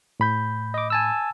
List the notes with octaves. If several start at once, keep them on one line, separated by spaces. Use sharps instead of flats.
A2 B5 G6
D#5 D6
G#5 A5 E6